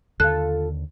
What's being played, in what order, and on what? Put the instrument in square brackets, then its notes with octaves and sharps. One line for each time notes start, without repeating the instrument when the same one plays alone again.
[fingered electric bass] D#2 D3 [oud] F4 A4 [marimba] F#6